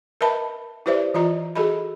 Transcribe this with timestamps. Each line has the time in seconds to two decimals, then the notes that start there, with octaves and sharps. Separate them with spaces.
0.21 A#4 B4 D#5 E5 A5 B5
0.86 E4 G4 B4 C5 D5 E5
1.14 E3 F4 D5 D#5 A#5
1.55 F#4 G#4 A4 D#5 B5